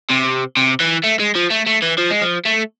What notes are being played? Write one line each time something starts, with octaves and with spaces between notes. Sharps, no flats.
C3
C3
E3
A3
G#3
F3
A3
A3
E3
F3
G#3
F3
A3